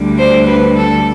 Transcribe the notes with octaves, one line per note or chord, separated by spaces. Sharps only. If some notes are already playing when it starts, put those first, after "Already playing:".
Already playing: D2 D3 G3
C5
B4
A4